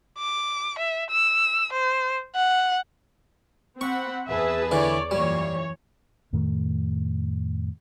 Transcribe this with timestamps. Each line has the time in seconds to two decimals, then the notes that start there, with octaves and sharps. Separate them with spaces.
0.18 D6
0.79 E5
1.10 E6
1.73 C5
2.36 F#5
3.81 C4 F#5 B5 C#6
4.29 E2 G#4 B4 E5 A5
4.71 D3 E3 C#5 D5
5.11 F#2 A#2 E3 G3 C#5
6.33 F2 A2 D#3 A3